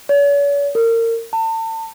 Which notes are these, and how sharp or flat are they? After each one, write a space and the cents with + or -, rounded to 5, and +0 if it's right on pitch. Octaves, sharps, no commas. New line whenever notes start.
C#5 +45
A#4 -30
A5 +35